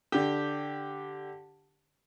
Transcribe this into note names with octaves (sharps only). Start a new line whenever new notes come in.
D3 G4